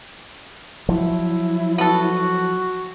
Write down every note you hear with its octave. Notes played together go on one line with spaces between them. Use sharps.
F3 F#3 E4
B3 F#4 A4